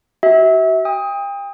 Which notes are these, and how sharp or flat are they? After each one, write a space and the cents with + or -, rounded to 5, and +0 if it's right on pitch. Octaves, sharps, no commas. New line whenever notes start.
F#4 +40 E5 -25
G5 +35 D#6 +15